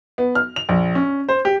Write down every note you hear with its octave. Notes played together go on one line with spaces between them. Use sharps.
B3
F6
F7
A#1
C#4
C5
G4